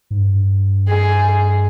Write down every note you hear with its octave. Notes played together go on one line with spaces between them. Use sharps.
G#2
G2
G#4